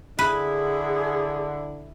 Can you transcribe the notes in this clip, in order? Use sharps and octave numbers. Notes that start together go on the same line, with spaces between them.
D3 E4 G#4 B4